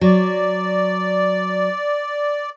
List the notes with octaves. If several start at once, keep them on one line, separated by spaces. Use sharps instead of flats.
F#3 D5